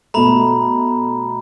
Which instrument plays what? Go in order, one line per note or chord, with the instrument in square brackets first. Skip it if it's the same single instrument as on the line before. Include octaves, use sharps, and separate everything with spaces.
[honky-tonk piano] B2 A3 [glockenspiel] A#5 B5